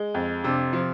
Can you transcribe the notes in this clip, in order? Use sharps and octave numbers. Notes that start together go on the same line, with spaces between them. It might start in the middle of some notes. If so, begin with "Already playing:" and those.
Already playing: G#3
F2
C3 D4
F3